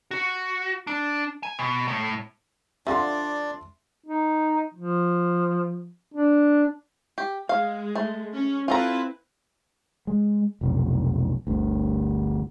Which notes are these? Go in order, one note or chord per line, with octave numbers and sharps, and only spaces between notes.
F#4
D4
G#5
B2
A2
D3 F3 D4 D5 E5 C6
D#4
F3
D4
G4
G#3 F5
A3
C#4
C4 E4 F4 A4 B4 A#5
G#3
F1 B1
G1 D2